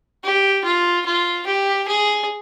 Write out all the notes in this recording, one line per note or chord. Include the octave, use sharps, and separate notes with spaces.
G4
F4
F4
G4
G#4